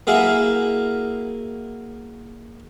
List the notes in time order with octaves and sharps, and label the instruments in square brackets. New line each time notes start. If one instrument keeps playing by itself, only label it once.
[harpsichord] A#3 E4 F#4 G#4 F5